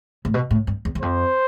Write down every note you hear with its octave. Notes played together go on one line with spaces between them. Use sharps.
A2
B2
A2
G2
E2
E2
F2 C5